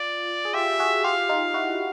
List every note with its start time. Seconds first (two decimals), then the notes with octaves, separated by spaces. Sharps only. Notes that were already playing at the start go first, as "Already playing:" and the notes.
Already playing: F4 D5
0.45 G#4
0.53 F4 G4 E5
0.79 F#4 G#4
1.04 F4 G4 F5
1.29 D#4 F4
1.54 E4 F#4